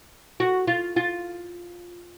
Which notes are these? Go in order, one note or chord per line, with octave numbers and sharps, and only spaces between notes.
F#4
F4
F4